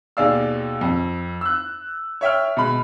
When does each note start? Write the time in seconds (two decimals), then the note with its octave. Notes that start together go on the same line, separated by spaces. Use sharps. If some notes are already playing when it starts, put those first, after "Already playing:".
0.17 D#2 B2 G#4 D5 F5 E6
0.81 F2
1.41 E6 F#6
2.21 C#5 E5 G5 F6
2.57 B2 G#3 B5